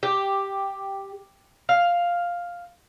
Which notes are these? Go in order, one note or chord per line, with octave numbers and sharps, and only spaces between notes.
G4
F5